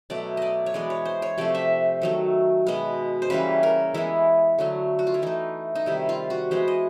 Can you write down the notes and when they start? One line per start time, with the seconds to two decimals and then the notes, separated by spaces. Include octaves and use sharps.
0.10 B2 F#3 A3 D5
0.37 D5 D#5
0.66 C#5
0.74 E3 G#3 B3 D5
0.90 C#5
1.05 C5
1.22 C#5
1.38 C3 F3 A3 D5
1.55 E5
2.02 D#3 F#3 A3
2.67 B2 G#3 B3
3.22 C5
3.30 C#3 E3 G3 A#3 B4
3.63 A#4
3.94 E3 G#3 B3 E4
4.59 D3 F#3 A3
4.99 F#4
5.07 F4
5.14 E4
5.22 E3 A3 D#4
5.75 D#4
5.86 C3 D#3 G3 E4
6.09 F4
6.30 F#4
6.51 E3 G#3 B3 C5
6.68 D#5